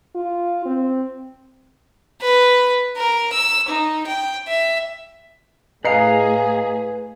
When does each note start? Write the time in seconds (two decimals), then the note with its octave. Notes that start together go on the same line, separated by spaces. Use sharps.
0.15 F4
0.66 C4
2.22 B4
2.97 A#4
3.33 E6
3.69 D#4
4.07 G5
4.48 E5
5.85 A2 G#4 B4 D#5 F5 A#5 C7